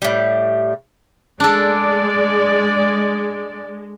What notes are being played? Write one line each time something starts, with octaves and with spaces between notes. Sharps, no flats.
A2 G3
G#3 D4 A4 D5